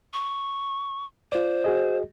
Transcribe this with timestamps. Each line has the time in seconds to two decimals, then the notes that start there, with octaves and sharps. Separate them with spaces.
0.13 C#6
1.32 F4 C5 D5
1.64 F#4 G#4 D#5